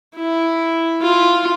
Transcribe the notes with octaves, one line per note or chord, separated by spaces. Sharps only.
E4
F4